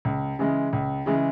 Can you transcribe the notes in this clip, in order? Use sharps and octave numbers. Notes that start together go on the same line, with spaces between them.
C#2
C#3 E3 G#3
C#2
C#3 E3 G#3